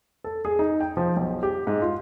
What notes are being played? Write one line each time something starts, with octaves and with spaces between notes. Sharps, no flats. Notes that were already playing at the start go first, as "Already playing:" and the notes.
A4
G#4
D#4
G5
F3
B1
G4
G#2
F4